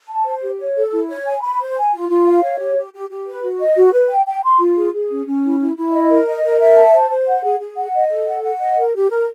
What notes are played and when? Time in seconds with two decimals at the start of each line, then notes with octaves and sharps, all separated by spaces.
0.10 A5
0.26 C5
0.42 G4
0.59 C#5
0.76 A4
0.92 E4
1.09 C#5
1.26 G#5
1.43 B5
1.60 C5
1.77 G#5
1.93 F4
2.10 F4
2.26 F5
2.43 C#5
2.59 G4
2.77 G4
2.93 G4
3.09 G4
3.26 B4
3.43 F#4
3.60 D#5
3.77 F#4
3.93 B4
4.10 G5
4.26 G5
4.43 C6
4.60 F4
4.76 G#4
4.93 G#4
5.10 C#4
5.26 C#4
5.44 E4
5.60 E4
5.76 E4
5.93 D#5
6.10 A#4
6.27 D#5
6.44 A#4
6.60 E5
6.77 A5
6.93 C5
7.10 C5
7.27 F#5
7.44 G#4
7.60 G#4
7.77 F#5
7.94 D#5
8.11 A4
8.27 F#5
8.43 F#5
8.60 D#5
8.77 A#4
8.94 G4
9.10 A#4